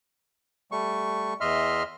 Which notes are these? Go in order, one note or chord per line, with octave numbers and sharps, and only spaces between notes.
G3 A3 C#6
E2 D#5 E5 C6 F6